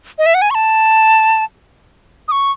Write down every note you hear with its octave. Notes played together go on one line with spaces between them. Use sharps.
D#5
E5
F#5
G#5
C#6
A5
D#6
C#6